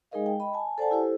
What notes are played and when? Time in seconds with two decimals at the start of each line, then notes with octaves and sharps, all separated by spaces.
0.11 G#3 D#4 G#4 A#4 D#5 F5
0.26 G5
0.40 D#5 B5
0.54 G#5 A5
0.78 A4 C5 D5 F#5 G#5 A5
0.91 E4 G4 A4 C5